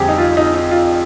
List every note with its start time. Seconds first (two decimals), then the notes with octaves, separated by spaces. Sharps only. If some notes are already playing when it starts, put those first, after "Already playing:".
Already playing: F2 D3 G3 C4 G4 G#4
0.09 D#4
0.18 F4
0.37 D#4
0.55 D#4
0.71 F4